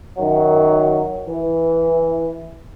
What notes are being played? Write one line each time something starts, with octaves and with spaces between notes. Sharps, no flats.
F#2 D#3 F#3
E3